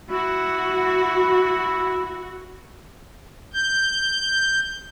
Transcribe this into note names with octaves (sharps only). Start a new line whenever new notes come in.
E4 F#4
G6